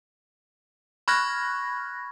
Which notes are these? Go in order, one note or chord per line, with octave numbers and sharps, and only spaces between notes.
B5 C#6 F6 F#6 G#6 A#6